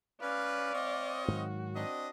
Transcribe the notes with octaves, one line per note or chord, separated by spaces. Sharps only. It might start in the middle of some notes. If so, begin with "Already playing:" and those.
C#4 B4 D5 F5
C4 C#5 D#5
G#2 D#3 F#3 F#4
C4 D4 D#5